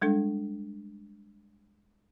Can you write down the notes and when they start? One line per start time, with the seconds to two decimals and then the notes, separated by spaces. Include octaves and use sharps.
0.02 G3 G#3 D4 A4